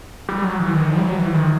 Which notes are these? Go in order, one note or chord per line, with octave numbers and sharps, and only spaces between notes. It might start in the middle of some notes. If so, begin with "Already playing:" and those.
G3
F#3
E3
D#3
F3
G3
F#3
E3
D#3